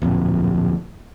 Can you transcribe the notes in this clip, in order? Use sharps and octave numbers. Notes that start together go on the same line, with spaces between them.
D1 A#1 F2